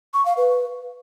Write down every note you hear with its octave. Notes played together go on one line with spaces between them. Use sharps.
C#6
F5
B4